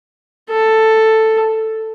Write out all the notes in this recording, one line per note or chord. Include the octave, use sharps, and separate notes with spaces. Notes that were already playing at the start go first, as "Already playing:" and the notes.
A4